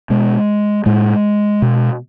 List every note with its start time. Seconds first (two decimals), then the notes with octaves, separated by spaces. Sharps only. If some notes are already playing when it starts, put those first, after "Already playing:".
0.10 B2 G#3
0.86 A2 G#3
1.62 B2